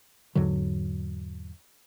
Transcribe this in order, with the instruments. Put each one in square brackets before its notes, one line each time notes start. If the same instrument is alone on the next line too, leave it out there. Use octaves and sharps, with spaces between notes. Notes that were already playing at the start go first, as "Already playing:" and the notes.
[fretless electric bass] E2 G#2 D3 F#3